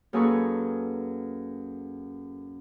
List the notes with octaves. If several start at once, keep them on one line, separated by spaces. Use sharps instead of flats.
F#2 A#3 G#4 A4 B4 C#6